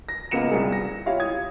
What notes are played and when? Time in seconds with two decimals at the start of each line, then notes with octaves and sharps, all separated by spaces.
0.09 A#6
0.31 C#2 A#3 B3 C#7 E7
0.51 C2 G3 G#4
0.72 A#6
1.06 E4 F4 G4 C#5 F5
1.20 D#6 G#6